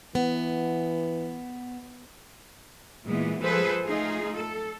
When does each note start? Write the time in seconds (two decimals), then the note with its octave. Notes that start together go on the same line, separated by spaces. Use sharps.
0.15 E3 B3
3.06 A#2 E3 G#3 B3
3.41 F3 G#3 G#4 A4 B4 C5
3.84 A3 D#4 F4 G#4
4.35 A4